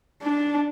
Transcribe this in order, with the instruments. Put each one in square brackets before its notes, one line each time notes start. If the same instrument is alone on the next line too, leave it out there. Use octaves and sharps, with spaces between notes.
[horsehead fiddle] D4